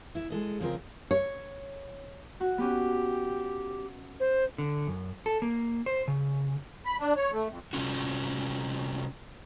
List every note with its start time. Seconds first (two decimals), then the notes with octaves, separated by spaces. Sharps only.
0.15 E4 E5
0.30 G#3 A4 D#5
0.61 C#3 F3 G#3 C4 F4 A#4
1.11 C#5
2.40 F#4
2.58 B3 C#4 G4
4.19 C5
4.58 D3
4.87 F#2
5.26 A4
5.42 A#3
5.86 C5
6.08 C#3
6.86 B5
7.00 D4
7.16 C#5
7.32 A3
7.50 F2
7.73 C3 G3 C#4 F4 F#4